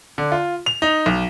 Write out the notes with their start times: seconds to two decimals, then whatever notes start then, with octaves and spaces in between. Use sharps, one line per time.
0.18 D3
0.32 F4
0.66 F7
0.82 D#4
1.06 B1